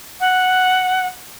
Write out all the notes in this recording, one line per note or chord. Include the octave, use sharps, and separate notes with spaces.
F#5